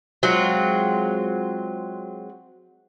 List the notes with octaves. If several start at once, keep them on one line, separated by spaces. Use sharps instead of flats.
F#3 G#3 C4 F4